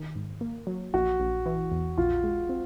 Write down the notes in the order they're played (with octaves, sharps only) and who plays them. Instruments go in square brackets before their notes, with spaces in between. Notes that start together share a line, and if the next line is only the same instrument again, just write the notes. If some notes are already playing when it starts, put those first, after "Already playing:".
Already playing: [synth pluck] D#3
G#2
A#3
F#3
[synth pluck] A#1 [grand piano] F#4
[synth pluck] A#1
E3
E2
[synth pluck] A#1 [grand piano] F4
[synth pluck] G#3
C4